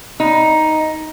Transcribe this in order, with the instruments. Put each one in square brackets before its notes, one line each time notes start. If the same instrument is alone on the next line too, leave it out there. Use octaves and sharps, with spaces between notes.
[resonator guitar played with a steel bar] D#4